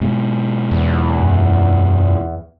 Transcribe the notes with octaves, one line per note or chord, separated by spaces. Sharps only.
G#2 B2
E2
F#2